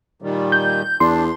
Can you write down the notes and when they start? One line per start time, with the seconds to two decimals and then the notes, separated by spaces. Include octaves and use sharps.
0.22 A#2 D#3 G3
0.52 G6
1.00 E2 D4 C6